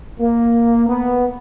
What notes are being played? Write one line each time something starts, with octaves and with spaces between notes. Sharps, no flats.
A#3
B3